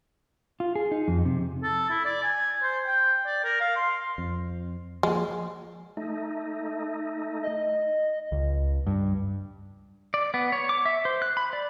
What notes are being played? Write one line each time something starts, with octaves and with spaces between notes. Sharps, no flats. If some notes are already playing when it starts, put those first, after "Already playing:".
F4
G#4
D#4
F2
C3
A4
E4
D5
G#5
C5
G5
D5
A#4
F5
C6
F2
F3 G#3 A#3
A3 D#4
D#5
C#2
G2
D5
B3
C#5
D6
E5
C5
F#6
B5
D5